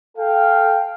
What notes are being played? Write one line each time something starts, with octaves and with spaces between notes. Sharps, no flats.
A4 F5 G5